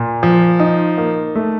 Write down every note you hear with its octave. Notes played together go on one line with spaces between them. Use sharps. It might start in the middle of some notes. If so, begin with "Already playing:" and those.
Already playing: A#2
F3
D#4
A#3
A3